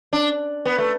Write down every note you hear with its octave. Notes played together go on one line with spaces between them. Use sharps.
D4
B3
A3